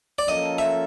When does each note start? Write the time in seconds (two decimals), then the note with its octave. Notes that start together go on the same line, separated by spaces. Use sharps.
0.19 D5
0.28 F3 A#3 C#4 F4 A4 D#5
0.58 E5